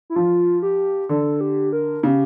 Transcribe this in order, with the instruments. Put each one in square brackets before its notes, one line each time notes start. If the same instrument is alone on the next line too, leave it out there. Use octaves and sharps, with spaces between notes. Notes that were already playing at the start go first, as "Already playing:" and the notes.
[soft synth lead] E4
[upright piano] F3 [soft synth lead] F4
[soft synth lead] G4
[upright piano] D3 [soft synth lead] A4
[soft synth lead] G4
A#4
[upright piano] C#3 [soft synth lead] G4